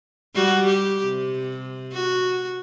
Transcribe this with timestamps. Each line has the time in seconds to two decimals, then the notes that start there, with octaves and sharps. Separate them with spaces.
0.35 G3 F#4
0.67 G4
1.04 C3
1.93 F#4